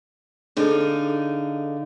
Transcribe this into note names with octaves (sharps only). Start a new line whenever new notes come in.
D3 D#4 G#4 A4 F5